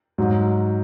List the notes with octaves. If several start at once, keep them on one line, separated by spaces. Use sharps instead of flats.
G#2 F#3